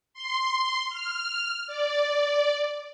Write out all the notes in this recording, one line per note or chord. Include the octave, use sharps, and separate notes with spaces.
C6
F6
D5